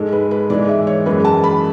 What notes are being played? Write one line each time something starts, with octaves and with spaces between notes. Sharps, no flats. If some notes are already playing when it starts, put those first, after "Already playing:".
Already playing: G#2 G#3 A4
B4
B4
G#2 E3 G#3 D5
E5
C#5
F#2 E3 G#3 B4
A5
B5